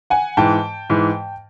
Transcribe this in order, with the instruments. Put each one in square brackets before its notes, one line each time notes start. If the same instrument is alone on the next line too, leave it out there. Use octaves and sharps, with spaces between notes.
[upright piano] F#5 G#5
G#2 E3 G5 A5
G#2 E3